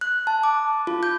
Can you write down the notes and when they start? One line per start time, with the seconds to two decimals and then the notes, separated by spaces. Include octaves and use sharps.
0.01 F#6
0.27 A5
0.43 D6
0.87 F4
1.03 G6